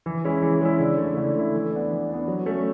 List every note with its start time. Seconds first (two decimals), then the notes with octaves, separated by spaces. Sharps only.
0.06 E3
0.25 G#3 C#4 E4
0.42 E3
0.61 G#3 C#4 E4
0.79 D3
0.98 A3 E4
1.17 D3
1.34 A3 E4
1.54 E3
1.72 B3 D4
1.91 E3
2.08 D4
2.14 B3
2.28 F#3
2.46 A3 C#4